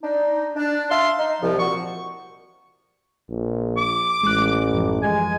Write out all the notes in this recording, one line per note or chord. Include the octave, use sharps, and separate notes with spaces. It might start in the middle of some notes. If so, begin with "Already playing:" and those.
D4 D#4
D4
E5 F5 A5 C6
D#4
C2 F3
A#2 F#4 C#6
A#1
D6
A1 G#3 F#6
F#2 E3 F3
G#3 G#5